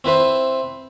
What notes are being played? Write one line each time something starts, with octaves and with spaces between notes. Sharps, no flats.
C4 E4 B4 C5